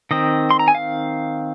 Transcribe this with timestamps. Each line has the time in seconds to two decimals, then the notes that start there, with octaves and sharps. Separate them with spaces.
0.11 D#3 C4 D#5
0.51 C6
0.59 A#5
0.68 G#5
0.75 F5